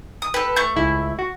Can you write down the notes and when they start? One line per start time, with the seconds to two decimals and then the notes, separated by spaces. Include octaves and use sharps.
0.22 D#6
0.34 G4 A4 B4
0.56 A3 C#6 G6
0.76 C#2 E4
1.19 F#4